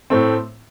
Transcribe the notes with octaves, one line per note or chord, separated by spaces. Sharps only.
A2 A3 C4